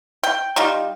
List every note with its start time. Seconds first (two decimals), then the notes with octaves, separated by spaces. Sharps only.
0.23 G5
0.56 G3 D#4 F4